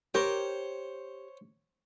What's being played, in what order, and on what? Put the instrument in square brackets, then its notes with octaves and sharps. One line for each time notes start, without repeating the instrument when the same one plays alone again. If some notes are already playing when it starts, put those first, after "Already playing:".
[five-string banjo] G4 A#4 [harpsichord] C5 C#5